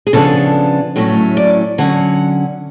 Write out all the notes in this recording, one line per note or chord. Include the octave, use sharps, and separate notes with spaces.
G#4
C#3 F3 B3 D4 A4
A2 F#3 A3 C#4
D5
D3 F#3 C#4 F#5